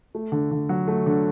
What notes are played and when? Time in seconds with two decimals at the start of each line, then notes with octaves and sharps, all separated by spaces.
0.15 A3
0.32 D3
0.51 D3
0.69 F#3
0.88 A3
1.06 D3